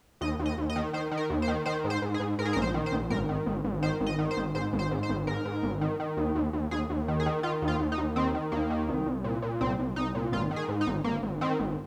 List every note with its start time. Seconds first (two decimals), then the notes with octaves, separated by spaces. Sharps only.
0.21 D#2 D#5
0.39 D#2
0.46 D#5
0.58 D#2
0.70 D#5
0.76 D#3
0.93 D#3 C5
1.11 D#3
1.17 A#4
1.30 D#2
1.42 C5
1.48 D#3
1.66 D#3 C5
1.84 G#2
1.90 C5
2.02 G#2
2.14 G#4
2.20 G#2
2.39 G#2 A#4
2.45 G#4
2.53 A#4
2.56 A#1
2.62 C5
2.74 D#3
2.86 C5
2.92 A#1
3.10 G#1 A#4
3.29 D#3
3.46 G#1
3.65 G#1
3.82 D#3 C5
4.01 G#1
4.06 D#5
4.19 D#3
4.31 C5
4.37 G#1
4.55 G#2 C5
4.73 G#1
4.79 C5
4.91 G#2
5.03 C5
5.09 G#1
5.27 G#2 A#4
5.45 G#2
5.63 G#1
5.81 D#3
6.00 D#3
6.17 D#2
6.35 D#2
6.53 D#2
6.71 D#2 G#4
6.90 D#2
7.08 D#3
7.20 G#4
7.26 D#3
7.43 D#3 F4
7.62 D#2
7.68 F4
7.80 D#2
7.92 D#4
7.98 D#2
8.16 D#3 C4
8.35 D#3
8.52 D#2 A#3
8.70 D#3
8.89 C2
9.06 C2
9.24 A#2
9.42 A#2
9.61 C2 C4
9.79 C2
9.96 C2 D#4
10.15 A#2
10.32 G#1 F4
10.51 D#3
10.56 G#4
10.68 G#2
10.81 D#4
10.87 G#1
11.04 G#1 A#3
11.23 G#1
11.41 D#3 C4
11.59 G#1